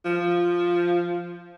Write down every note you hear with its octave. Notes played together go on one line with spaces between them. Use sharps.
F3